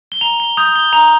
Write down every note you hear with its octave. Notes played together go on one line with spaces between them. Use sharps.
G7
A#5 F7
G7
D#6 G6 F7
G7
A#5 F7